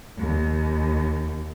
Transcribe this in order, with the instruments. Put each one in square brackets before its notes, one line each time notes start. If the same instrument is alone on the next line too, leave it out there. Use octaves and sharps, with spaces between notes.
[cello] D#2